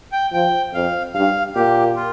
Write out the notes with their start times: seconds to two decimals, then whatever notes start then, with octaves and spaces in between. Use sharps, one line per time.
0.12 G5
0.32 F3 G5
0.73 F2 F5
1.15 G2 F5
1.55 A#2 G4
1.96 F4